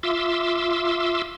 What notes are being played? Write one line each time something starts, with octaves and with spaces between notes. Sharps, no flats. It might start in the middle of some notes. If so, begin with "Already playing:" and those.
F4 E5 C6 D6 E6